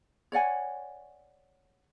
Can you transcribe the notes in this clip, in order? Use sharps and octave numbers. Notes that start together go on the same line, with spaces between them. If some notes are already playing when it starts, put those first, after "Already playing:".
C#5 D5 F#5 G#5